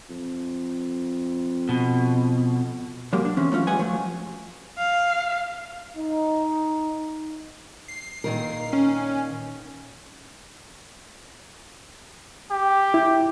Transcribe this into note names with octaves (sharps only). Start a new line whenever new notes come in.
F2
B2
F#3 G#3 A#3 G4
D4
E3 C4 C#4
F#3 A3 C#4 F4
G3 G#3 B4 F#5 G#5
F3 F#3 A3
F5
D#4
C7
A#2 D#3 A#4
C#4
G4
E4